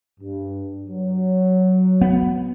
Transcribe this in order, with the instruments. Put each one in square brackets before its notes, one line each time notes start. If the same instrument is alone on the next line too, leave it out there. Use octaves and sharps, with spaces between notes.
[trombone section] G2
F#3
[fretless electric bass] B3